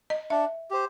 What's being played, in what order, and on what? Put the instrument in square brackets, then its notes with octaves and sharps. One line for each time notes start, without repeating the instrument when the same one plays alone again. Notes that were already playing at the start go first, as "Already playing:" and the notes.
[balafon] D#5
[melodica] D4 [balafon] E5
[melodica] G4 C5